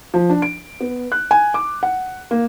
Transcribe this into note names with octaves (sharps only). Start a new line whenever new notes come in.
F3
D4
D7
B3
F#6
G#5
D6
F#5
A#3